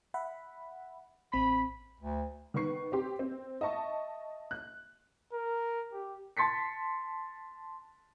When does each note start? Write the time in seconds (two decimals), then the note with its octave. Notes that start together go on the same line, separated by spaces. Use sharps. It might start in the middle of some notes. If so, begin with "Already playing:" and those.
0.14 E5 F#5 B5
1.32 A1 C4 B5 B6
2.00 D2
2.54 D#3 B3 B4 C#6 C7
2.92 C4 G4 C6
3.19 C4
3.61 D#5 E5 A5 C#6
4.51 F#6
5.33 A#4
5.93 G4
6.37 A5 C6 A6 B6 C#7